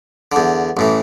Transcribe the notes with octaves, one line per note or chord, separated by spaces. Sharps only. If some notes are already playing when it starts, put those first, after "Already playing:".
E2 D3
A1 A2 E3